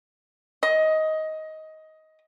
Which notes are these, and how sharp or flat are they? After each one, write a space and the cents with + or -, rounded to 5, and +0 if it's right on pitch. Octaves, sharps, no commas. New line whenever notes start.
D#5 +15